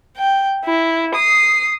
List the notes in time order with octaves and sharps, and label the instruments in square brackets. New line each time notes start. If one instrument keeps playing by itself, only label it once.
[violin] G5
E4
D#6 C7